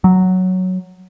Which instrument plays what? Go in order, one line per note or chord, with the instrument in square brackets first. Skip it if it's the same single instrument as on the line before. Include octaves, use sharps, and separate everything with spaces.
[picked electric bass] F#3